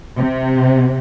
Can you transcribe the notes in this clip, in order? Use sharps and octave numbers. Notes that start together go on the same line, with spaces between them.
C3